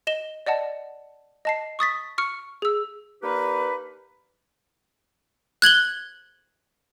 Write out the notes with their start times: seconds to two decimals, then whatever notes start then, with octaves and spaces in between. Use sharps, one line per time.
0.07 D#5 E7 G7
0.46 D5 D#5 F#5 A5
1.45 D#5 A5 C7
1.79 C#6 D#6 A6 B6
2.18 C#6 F6 C#7
2.62 G#4 E6
3.22 A#3 D4 D#4 G4 B4
5.62 F#6 G#6 F#7 G7